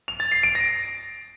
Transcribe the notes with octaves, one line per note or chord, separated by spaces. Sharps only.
F7
A6
C7
D7
A#6